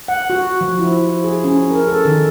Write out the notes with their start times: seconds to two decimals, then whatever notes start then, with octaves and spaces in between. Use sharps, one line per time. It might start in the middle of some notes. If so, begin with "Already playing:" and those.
0.08 F#5
0.30 F#4
0.61 F3
0.79 E4
1.24 G#4
1.44 C#4
1.71 A#4
1.87 A4
2.05 D#3